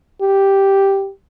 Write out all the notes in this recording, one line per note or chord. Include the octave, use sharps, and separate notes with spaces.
G4